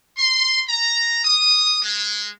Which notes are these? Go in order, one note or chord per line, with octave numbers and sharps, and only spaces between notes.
C6
A#5
D#6
G#3